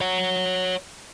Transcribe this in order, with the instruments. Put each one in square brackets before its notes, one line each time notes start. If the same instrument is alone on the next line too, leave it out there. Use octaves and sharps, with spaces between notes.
[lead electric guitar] C#5 F#5